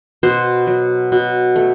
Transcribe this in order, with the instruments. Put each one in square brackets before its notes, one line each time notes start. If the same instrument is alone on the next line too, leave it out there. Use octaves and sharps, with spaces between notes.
[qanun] B2 C5
F#3
B2
A3